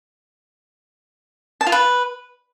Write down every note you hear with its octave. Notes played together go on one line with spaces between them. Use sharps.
A5
F4
B4